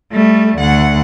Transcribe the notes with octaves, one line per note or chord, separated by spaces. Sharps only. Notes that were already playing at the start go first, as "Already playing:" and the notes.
G3 A3
D2 F#5